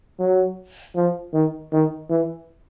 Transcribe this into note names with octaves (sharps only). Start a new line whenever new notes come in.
F#3
F3
D#3
D#3
E3